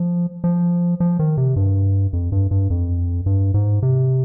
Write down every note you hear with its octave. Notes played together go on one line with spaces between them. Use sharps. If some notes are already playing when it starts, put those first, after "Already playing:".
Already playing: F3
F3
F3
D#3
C3
G2
F2
G2
G2
F2
G2
G#2
C3